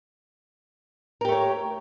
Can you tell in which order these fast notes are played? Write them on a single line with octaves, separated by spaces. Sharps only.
A#4 G4 A3 C#5